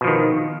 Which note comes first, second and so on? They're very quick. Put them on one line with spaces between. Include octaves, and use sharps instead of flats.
B2 F3 D#3